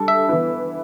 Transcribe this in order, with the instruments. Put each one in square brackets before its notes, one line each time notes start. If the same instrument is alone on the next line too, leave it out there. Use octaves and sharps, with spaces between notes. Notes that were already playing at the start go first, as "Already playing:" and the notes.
Already playing: [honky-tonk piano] G3 D4 A4
[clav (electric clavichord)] E5
[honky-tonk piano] E3 B3 E4 B4